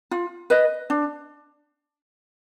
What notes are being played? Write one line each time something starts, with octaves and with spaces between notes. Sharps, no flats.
F4
B4 D#5
D4